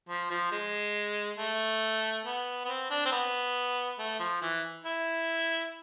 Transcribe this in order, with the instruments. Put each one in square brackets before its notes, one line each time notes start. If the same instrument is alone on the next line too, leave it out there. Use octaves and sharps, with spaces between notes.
[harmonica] F3
F3
G#3
A3
B3
B3
C4
D4
C4
B3
A3
F3
E3
E4